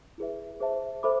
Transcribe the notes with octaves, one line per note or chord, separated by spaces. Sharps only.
E4 G#4 B4 E5
G#4 C5 E5 A5
A4 C5 E5 B5 D6